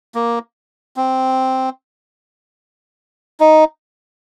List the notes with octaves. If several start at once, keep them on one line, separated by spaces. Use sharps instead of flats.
A#3
C4
D#4